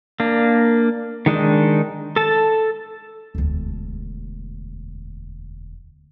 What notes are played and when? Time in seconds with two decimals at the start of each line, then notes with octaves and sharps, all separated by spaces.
0.20 A#3 D4
1.26 D#3 G#3 D4 D#4
2.16 A4 A5
3.35 E1 D2